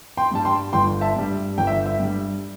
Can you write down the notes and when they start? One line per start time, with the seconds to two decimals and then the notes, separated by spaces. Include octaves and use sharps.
0.17 G5 C6
0.31 G2 G3 A5
0.45 G5 C6
0.73 G1 G5 C6
1.01 E5 A5
1.16 G2 G3
1.58 G1 G5
1.67 E5
1.86 E5
1.99 G2 G3